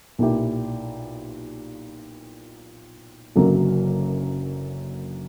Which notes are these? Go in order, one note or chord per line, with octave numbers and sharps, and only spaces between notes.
B1 A#2 A#3 E4 G4
F#1 F#2 D3 F#3 A#3